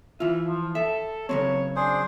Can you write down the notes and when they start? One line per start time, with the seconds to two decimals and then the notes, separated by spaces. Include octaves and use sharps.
0.20 E3 F4 E5
0.47 F3
0.75 A4 E5
1.29 C#3 F#3 C4 C#5
1.76 D4 G#4 C5